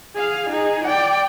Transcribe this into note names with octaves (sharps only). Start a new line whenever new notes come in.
G#4 F5
D#4 G#4
D5 G5